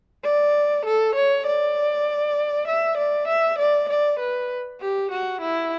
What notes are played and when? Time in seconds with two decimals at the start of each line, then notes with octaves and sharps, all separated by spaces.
0.24 D5
0.85 A4
1.16 C#5
1.46 D5
2.68 E5
2.98 D5
3.28 E5
3.59 D5
3.89 D5
4.20 B4
4.81 G4
5.11 F#4
5.41 E4